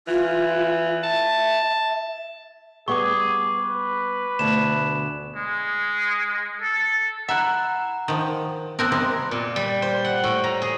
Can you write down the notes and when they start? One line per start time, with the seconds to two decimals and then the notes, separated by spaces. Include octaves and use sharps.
0.08 E3 F4
1.03 E5 A5
2.88 G3 B3 G#4 F#5 C#6 D6
3.57 B4
4.39 D2 B2 E7
5.36 G#3
6.62 A4
7.28 E4 E5 F#5 A#5 F#6
8.08 D#3 F3
8.79 F3 B3 C4 A#4 F#6
8.92 C3 G3 G#3
9.31 A#2
9.56 G3
9.82 C5
10.05 F#5
10.24 A2
10.44 A#5
10.62 G#4